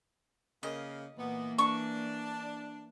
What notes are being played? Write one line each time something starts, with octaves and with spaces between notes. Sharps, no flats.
C#3 A#3 D#5
A#2 E3 A#3 B3
D4 C#6